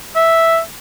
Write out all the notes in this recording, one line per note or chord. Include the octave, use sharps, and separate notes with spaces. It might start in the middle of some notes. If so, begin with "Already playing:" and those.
E5